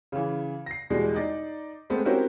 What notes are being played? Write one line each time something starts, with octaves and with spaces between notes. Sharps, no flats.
C#3 E3
A#6 C7
E2 B2 G3 G#3
D#4 D5 D#5
G#3 A3 B3 C4
C4 C#4 E4 F#4 G4 A#4